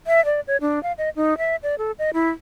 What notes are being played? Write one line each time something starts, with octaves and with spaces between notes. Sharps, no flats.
E5
D5
C#5
D4
F5
D#5
D#4
E5
D5
A4
D#5
E4